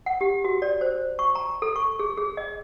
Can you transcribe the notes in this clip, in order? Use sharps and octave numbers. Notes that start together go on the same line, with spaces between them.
F#5
G4
F#4
D5
C5
C#6
A#5
A4
C#6
G#4
G#4
D#5